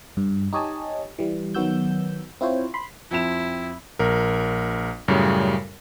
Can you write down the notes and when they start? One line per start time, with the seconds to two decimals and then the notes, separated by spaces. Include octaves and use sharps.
0.17 G2
0.53 D#4 G4 C#5 D#5 G#5 A5
1.19 E3 G3
1.55 D#3 F#3 B3 F#4 E6 G6
2.41 C4 E4 F4 C5 C#5
2.74 B5 C6
3.11 F2 C4 E4 E7
3.99 A#1 A#4
5.08 F#2 A2 C#3 G3